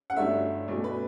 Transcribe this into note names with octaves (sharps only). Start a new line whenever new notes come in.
F#5
G1 G2 F#3 A3 E5
B1 B2 F#3 A3
B4